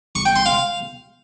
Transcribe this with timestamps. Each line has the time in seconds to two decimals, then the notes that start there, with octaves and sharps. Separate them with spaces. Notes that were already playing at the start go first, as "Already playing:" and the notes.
0.15 C#6
0.25 G5
0.36 C6
0.46 F5